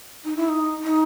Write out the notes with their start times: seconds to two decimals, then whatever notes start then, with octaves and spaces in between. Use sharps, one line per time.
0.25 D#4
0.37 E4
0.48 D#4
0.83 D#4